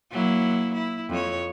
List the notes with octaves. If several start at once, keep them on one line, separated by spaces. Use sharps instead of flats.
F#3 A#3 E4
E4
F2 C#5